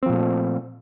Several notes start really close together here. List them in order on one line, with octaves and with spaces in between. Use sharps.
C4 F3 A#2 A3